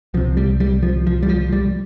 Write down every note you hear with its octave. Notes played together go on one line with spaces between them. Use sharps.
C2 C3 F3
G3
G3
F3
F3
G3
F3
G3